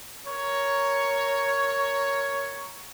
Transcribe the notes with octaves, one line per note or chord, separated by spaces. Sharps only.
A#4 C#5